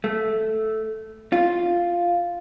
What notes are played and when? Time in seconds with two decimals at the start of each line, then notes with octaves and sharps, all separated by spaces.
0.04 A3
1.32 F4